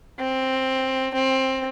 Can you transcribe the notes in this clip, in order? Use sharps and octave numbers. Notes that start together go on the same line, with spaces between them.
C4
C4